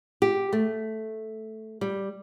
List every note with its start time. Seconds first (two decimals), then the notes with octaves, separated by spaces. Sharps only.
0.22 G4
0.53 A3
1.81 G3